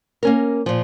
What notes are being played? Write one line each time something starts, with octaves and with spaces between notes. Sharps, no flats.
A#3 C#4 A#4
A#2 F3